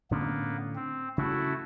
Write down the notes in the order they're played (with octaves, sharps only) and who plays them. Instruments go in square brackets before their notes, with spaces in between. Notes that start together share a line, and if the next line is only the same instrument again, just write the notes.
[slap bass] A2 D3 C#4 [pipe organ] A#3 B3
[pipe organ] C4
[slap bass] C#3 [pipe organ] A3 E4 F#4